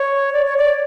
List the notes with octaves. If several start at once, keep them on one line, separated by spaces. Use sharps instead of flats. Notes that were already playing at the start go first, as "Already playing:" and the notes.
Already playing: C#5
D5
C#5
D5